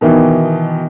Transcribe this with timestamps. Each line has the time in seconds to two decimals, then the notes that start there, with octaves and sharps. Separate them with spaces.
0.01 B2 D#3 E3